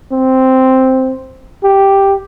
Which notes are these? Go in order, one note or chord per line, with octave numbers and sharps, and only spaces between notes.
C4
G4